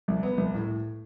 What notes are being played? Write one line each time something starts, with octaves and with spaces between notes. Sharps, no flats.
C2
B3
C2
A2